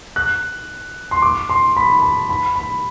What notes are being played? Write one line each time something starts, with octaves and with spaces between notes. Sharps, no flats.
F#6
C6
D6
C6
B5
A5
B5
B5